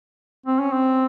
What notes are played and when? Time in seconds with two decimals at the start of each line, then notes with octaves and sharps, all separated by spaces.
0.46 C4
0.60 C#4
0.73 C4